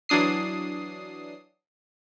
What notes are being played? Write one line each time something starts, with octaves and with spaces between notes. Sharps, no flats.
E3 F#3 D4 D#6 C7